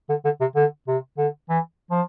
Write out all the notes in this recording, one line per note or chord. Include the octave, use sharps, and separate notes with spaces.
D3
D3
C3
D3
C3
D3
E3
F3